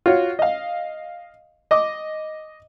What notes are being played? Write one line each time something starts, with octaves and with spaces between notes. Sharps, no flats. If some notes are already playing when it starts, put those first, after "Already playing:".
F4 F#4 C#5
D#5 F5
D#5 D6 D#6